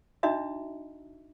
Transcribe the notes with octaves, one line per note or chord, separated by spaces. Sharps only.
D4 D#4 F#4 D#5 E5 A#5